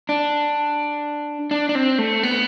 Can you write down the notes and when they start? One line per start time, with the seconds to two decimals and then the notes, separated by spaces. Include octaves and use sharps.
0.09 D4
1.51 D4
1.69 D4
1.75 C4
1.98 A3
2.23 B3